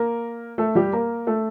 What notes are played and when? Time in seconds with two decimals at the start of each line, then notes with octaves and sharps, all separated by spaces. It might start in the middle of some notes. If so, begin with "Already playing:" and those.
Already playing: A#3 A#4
0.58 A3 A4
0.75 G3 G4
0.93 A#3 A#4
1.27 A3 A4